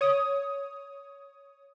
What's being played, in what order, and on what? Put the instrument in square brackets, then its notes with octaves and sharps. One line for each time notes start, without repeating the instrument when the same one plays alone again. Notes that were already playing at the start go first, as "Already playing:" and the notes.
[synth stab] C#5 D#6